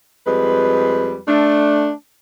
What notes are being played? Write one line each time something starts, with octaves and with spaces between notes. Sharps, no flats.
F2 G3 G#3 B4
A3 D4